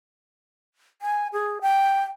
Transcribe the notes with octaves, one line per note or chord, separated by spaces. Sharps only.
G#5
G#4
G5